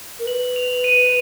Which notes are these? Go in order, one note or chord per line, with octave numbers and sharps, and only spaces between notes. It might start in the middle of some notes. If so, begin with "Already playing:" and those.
A#4
B4 F#7
F7
D#7